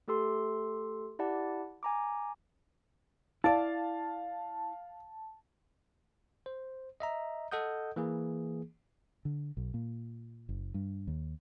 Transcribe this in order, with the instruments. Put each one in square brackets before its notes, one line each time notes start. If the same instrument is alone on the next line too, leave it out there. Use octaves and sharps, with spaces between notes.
[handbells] A3 G4 A4 C6
E4 G4 D5 F#5 A5
G#5 A#5 D6
[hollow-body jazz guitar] E4 D5 [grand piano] F5 [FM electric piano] A5
[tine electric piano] C5
D#5 E5 A#5
A4 D#5 F#5 D#6 G6
E3 A#3 G#4
[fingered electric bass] D3
B1
A#2
F#1
G2
D#2